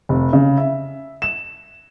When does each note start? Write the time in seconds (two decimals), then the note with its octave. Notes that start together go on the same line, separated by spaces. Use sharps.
0.09 F1
0.33 C#3
0.58 E5
1.22 E7